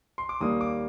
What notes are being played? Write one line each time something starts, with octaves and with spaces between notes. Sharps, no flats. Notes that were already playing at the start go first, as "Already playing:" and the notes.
C6
D6
D#2 D#3 G3 A#3 D#6
D6